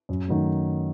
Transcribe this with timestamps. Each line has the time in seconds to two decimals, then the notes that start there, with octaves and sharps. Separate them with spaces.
0.09 F#2
0.28 D#3 F#3 A3